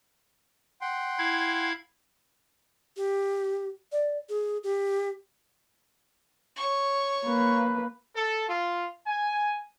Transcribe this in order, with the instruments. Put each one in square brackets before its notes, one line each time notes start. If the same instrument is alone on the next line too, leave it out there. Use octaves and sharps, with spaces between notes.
[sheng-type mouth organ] F#5 G5 C6
[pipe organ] E4 F5 G#6
[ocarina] G4
D5
G#4
G4
[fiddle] C#5 C#6
[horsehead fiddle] A#3 B4
[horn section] A4
F4
G#5